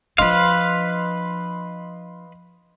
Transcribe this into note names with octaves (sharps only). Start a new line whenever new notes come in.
F3 D4 B4 D#5 F5 C6